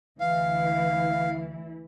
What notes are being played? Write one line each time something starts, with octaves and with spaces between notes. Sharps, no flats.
D2 E3 E4 F5